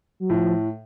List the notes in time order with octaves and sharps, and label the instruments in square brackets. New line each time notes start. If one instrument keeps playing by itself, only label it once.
[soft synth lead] F#3
[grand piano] A2 [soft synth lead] F3